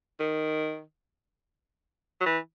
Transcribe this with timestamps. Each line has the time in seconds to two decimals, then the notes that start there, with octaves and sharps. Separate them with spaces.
0.20 D#3
2.20 F#3
2.26 E3